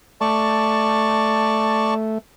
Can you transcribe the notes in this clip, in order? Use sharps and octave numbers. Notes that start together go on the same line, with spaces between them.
A3 D5 A5 C#6